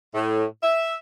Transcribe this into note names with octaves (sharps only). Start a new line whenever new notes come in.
A2
E5